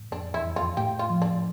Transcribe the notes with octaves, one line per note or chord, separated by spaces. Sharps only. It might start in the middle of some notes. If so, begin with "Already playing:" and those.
Already playing: A2
F2 D4
E2 E4
F2 F4
A2 G4
F4
F3
D4